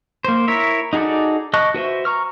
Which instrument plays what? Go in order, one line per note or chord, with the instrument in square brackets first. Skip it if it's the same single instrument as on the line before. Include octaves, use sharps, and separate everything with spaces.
[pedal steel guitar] A#3 C5
E4 A#4 C#5 E5
D#4 F#4 G#4 A4 D5
D#5 A5 C#6 F#6
F#4 B4 C5 E5
A#5 C#6 F6